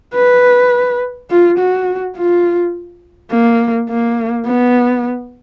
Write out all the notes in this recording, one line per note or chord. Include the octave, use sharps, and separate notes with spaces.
B4
F4
F#4
F4
A#3
A#3
B3